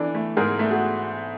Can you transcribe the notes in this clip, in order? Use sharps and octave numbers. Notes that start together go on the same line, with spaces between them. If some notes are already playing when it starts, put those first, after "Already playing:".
Already playing: E3 D4 A4
A3
G#2 G#4 A#4
A3
F#4 G#4